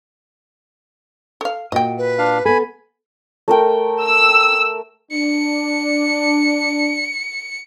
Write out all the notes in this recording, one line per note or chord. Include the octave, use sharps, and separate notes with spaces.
A4 F5
A#2 F#4 D#5 G5
B4
D4 F5
B3 A4 G#5 B5
A3 A#4 G5
E6
D4 C#7